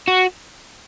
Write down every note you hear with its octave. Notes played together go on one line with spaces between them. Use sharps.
F#4